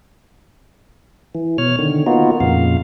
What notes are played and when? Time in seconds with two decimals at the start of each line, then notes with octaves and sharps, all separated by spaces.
1.35 E3
1.58 B2 C#5 F6
1.79 D3 D#3
2.07 A#3 B3 D#4 F4 F#4
2.40 F2 A#2 C#3 F5